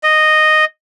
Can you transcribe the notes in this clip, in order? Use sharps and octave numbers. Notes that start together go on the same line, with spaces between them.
D#5